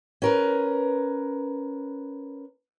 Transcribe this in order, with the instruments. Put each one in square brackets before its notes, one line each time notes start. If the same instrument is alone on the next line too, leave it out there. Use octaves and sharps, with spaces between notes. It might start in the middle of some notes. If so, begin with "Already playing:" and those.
[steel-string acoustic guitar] C#4 A#4 B4